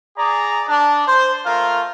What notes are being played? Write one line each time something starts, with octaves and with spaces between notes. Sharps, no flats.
G#4 D5 A#5
D4
C5
A3 F4 A#4